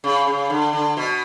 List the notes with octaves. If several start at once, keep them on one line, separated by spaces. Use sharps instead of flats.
C#3
C#3
D3
D3
B2